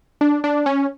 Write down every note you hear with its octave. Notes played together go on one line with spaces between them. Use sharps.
D4
D4
C#4